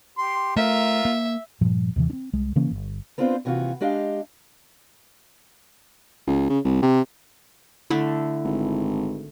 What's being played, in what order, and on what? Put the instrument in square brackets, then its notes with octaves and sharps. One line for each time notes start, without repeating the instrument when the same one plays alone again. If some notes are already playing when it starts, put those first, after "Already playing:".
[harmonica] G4 C6
[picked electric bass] A3 [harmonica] F4 A#4 [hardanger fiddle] E5
[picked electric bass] A#3
[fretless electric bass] G2 A#2 F3 G3
D#2 C3 E3
C4 D4
C2 G#3
C#3 E3 A#3 C#4
G1
[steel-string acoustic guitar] B3 C4 D4 F4 A4 C5
D#2 C3 E3 F4 F#4
G#3 D4 G4 D#5 F5
[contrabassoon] C#2
C#3
C2
C3
[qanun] D3 A3 [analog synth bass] E4
[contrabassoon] G#1